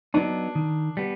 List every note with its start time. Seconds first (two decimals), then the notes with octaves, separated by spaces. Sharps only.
0.14 F#3 B3 D4 D#4
0.55 D#3
0.97 G3 B3